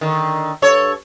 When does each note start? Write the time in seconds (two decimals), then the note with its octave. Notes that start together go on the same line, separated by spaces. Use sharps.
0.01 D3 D#3
0.62 G2 A4 C#5